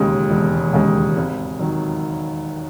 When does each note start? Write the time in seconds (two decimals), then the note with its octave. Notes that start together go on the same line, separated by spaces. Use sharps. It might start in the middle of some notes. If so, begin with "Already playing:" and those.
Already playing: E1 D#2 C#3 G#3
0.30 E1
0.73 D#2 C#3 G#3
1.16 G#1
1.59 D#3 F#3